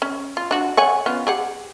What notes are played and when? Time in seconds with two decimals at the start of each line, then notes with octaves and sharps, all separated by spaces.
0.02 C#4
0.37 F4
0.51 D4 F#4
0.77 C#5 F#5 G#5
1.06 B3 C#4 F4
1.27 G4 G#4 F#5